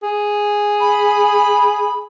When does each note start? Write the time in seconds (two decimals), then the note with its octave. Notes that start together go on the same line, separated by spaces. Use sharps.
0.03 G#4
0.80 B5